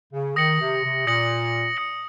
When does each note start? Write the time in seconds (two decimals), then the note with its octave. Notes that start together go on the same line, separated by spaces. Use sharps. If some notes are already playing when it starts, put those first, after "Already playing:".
0.12 C#3
0.36 D#3 D#6 A#6 C#7 F#7
0.60 C3
0.84 C3
1.07 A#2 D#6 A#6 C#7 F#7
1.77 D#6 A#6 C#7 F#7